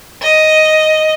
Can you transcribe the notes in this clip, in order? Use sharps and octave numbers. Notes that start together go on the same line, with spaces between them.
D#5